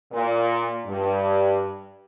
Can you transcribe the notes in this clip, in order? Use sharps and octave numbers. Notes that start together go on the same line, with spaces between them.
A#2
G2